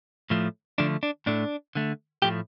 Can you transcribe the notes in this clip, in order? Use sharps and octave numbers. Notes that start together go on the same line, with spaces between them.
A2 F3 A3
D3 F3 A3 D4
D4
A2 A3 D4
D3 A3
A2 F3 A3 G4